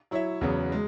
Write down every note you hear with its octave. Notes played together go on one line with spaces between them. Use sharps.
F#3 E4 C#5 E5
E2 C#3 F#3 B3
G#3